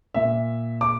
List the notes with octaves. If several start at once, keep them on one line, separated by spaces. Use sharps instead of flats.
A#2 E5
D6